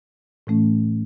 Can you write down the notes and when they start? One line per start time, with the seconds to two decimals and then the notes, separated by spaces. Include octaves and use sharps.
0.47 A2 E3 A3 C#4